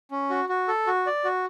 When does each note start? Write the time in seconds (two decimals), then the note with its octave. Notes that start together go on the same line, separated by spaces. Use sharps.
0.11 C#4
0.30 F#4
0.49 F#4
0.68 A4
0.87 F#4
1.07 D5
1.24 F#4